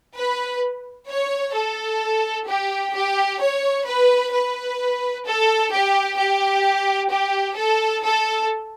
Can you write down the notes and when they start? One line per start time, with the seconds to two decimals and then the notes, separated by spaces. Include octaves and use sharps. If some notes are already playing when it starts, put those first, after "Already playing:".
0.17 B4
1.09 C#5
1.55 A4
2.48 G4
2.94 G4
3.40 C#5
3.87 B4
4.33 B4
5.26 A4
5.72 G4
6.18 G4
7.10 G4
7.57 A4
8.04 A4